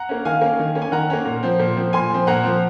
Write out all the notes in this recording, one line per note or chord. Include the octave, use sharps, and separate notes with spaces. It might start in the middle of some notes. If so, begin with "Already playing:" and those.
Already playing: F#5 A#5
A#3 C#4
D#3 F5 G#5
A#3 C#4
D#3
A#3 C#4
G#5
D#3 F#5 A#5
A#3 C#4
A#2
F3 C4
A#2
F3 C4
A#2 G#5 C6
F3 C4
A#2 F#5 A#5
F3 C4